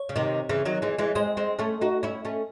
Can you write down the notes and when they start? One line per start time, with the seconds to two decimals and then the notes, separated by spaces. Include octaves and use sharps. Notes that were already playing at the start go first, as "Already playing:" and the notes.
Already playing: C#5
0.09 C#3
0.16 C3 D#3
0.49 C#3 E3
0.65 D#3 F#3
0.82 E3 G#3
0.98 E3 G#3
1.15 G#3 C4 D#5
1.37 G#3 C4
1.59 A3 C#4
1.81 D#4 F#4
2.03 C#4 E4
2.25 A3 C#4